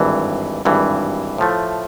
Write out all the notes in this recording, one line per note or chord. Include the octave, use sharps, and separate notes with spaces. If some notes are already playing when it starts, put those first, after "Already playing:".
Already playing: G#1 G2 E3
G#1 G2 E3
A2 F3 A3